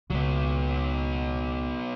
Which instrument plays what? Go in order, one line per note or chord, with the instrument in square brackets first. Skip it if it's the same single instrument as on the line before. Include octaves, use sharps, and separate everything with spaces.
[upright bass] C#2 A#2 [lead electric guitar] F#3 B3